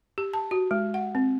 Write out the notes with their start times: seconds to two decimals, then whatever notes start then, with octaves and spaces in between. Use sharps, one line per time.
0.18 G4
0.34 A5
0.51 F#4
0.71 G#3
0.94 F#5
1.15 C4